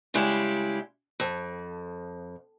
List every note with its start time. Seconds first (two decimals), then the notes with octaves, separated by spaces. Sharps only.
0.14 C#3 G3 G#3 E4 G4
1.20 F2